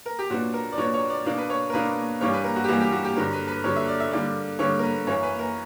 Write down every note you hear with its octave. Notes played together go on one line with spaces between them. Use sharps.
A#4
G4
A#2 F#3 B3 D4 F#4
A#4
D5
A#2 F#3 B3 D4 C#5
C#5
D5
B2 A#3 D4
B4
C#5
A#4
B2 A#3 D4 B4
G2 E3 G3 A#3 D4 C#5
B4
A#4
F#4
G4
G2 E3 G3 A#3 D4 F#4
G4
F#4
G4
G2 D3 F#3 A#4
B4
B4
G2 D3 F#3 C#5
E5
D5
E5
D3 G3 A#3 D5
D3 G3 A#3 C#5
A#4
B4
F#2 E3 A#3 C#4 C#5
B4
A#4